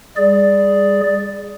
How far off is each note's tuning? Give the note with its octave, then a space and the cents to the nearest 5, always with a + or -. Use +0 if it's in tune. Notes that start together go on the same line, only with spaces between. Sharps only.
G3 +35 G#4 +0 D5 +0